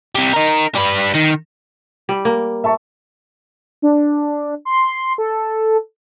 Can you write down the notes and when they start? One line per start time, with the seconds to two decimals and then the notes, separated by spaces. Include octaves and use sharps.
0.15 C3 G3
0.34 D#4 A#4
0.76 G3 B4
1.15 D#3
2.09 G3
2.25 A#3
2.64 E5 A5 C#6
3.82 D4
4.65 C6
5.18 A4